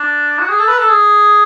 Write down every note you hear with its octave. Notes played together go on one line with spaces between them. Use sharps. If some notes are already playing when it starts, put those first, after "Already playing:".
Already playing: D4
F#4
G#4
A4
B4
A4
G#4